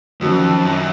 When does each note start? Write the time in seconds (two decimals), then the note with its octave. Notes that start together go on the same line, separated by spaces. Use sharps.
0.21 F2 D#3 F#3 C#4
0.65 F#2